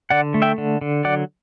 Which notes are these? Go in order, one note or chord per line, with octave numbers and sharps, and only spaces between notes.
D3 D5 F#5
A3
E5 G5
D3
D3
F#3 D5 F#5